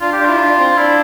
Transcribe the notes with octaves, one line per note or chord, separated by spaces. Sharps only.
D4 F4
G4
D4 F4
E4
D4
C4
D4 E4